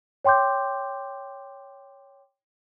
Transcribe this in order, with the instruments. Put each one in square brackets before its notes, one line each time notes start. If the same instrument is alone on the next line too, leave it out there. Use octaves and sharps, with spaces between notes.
[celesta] C#5 G5 C6 D6 G6